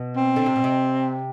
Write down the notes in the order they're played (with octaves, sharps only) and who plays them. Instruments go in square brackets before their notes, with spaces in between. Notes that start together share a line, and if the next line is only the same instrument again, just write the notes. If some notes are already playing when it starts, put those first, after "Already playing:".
Already playing: [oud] B2
[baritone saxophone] C4
[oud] D3
C3
B2
C3